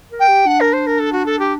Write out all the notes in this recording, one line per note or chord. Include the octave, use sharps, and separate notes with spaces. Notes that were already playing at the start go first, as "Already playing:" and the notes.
A#4
G5
G4
D4 F#5
A#4
C5
A#4
A4
F#4
A4
G4